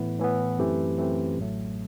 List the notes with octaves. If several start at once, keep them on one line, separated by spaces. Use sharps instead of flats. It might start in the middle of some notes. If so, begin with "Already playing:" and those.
Already playing: A2 E3 B3
A2 E3 B3
F#2 E3 A3 C4 G4
F#2 E3 A3 C4 G4
A1 A2 F#3 A3